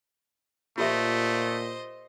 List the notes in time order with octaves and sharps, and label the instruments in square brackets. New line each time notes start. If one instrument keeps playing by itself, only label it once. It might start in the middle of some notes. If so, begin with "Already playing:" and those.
[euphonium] A#2 [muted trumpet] A3 [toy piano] F4 G4 E5 [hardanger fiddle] C5 D#5